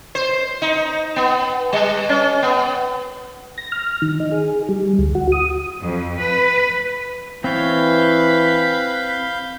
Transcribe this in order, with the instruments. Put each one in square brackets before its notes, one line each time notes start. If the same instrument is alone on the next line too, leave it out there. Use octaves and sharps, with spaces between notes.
[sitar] C5
D#4
B3
G3
C#4
B3
[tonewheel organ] A#6
F6
D#3
D#4
G#4
G3
D2
F#4
D#6
[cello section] F2
B4
[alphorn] E3 [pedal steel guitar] C4 C#5 [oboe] B4 [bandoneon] F5 G6